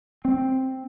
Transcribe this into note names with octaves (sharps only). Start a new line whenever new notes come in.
C4